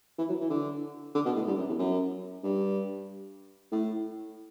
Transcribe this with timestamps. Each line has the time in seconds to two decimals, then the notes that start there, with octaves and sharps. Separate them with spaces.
0.18 E3
0.29 F#3
0.40 E3
0.50 D3
1.15 D3
1.26 B2
1.36 A2
1.47 G2
1.58 F#2
1.68 E2
1.79 F#2
2.44 G2
3.72 A2